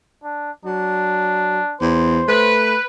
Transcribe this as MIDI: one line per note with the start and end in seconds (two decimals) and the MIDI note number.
0.24 0.51 62
0.65 1.60 54
0.65 1.76 62
1.81 2.22 40
1.81 2.53 72
2.28 2.75 57
2.28 2.86 71